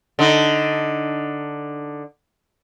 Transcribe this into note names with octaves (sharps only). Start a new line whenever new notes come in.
D3 D#4